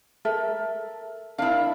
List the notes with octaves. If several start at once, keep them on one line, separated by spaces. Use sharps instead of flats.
A4 A#4 E5
D4 E4 A#4 F5